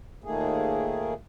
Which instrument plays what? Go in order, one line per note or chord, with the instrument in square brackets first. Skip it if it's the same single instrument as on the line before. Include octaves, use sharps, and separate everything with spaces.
[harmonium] D#2 A#2 D#3 A3 A#3 G#4